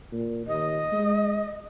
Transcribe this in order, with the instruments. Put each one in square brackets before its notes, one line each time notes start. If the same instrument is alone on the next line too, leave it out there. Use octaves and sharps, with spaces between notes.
[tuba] A#2
[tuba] D#2 [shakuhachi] D#5
[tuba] G#3